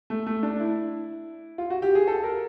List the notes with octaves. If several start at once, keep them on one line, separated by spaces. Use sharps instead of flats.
A3
A3
D4
E4
F4
F#4
G4
G#4
A4
A#4